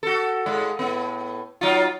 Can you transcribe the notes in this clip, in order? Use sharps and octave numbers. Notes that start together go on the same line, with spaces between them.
F#4 A4
G#2 G#3
A2 B3
F#3 D#4 F4